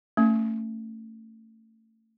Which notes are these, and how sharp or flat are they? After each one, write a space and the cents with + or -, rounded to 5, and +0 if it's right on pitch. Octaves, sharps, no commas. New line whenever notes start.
A3 +25 C#4 +0